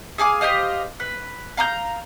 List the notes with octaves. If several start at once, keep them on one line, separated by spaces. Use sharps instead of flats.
G#4 F5 G#5 D6
G4 C5 D#5 F5
B4
F5 A#5 D6 G6